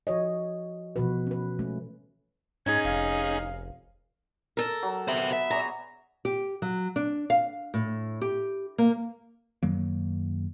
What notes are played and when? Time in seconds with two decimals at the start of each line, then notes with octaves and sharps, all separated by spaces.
0.07 F3 F#4 C#5 D#5
0.96 B2 E3 F3 F#4 B4
1.27 C#4 B4
1.59 G#3 A3 C#4
2.66 G#2 C#4 D#4 G#4 G#6
2.85 F1 F5
4.57 A4 A#4
4.83 F#3
5.08 B3 C5 E5
5.33 E5
5.50 G#4 C#5 D5 A#5
6.25 G4
6.62 F#3
6.96 D4
7.30 F5
7.74 A2
8.21 G4
8.78 A#3
9.63 F#2 D#3 F#3 A#3